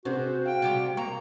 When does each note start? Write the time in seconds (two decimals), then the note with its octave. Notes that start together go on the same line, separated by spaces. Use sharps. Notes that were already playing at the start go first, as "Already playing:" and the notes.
0.05 C3 C4 F#4 G#4 C5
0.45 F5 G5
0.62 C3 G3 G4
0.97 A#3 A#5 C#6